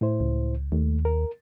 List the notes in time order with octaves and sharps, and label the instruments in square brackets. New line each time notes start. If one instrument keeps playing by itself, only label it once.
[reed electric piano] A2 E4 C5
[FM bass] C#2
[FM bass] D#2 [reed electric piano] A3
[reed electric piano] A#4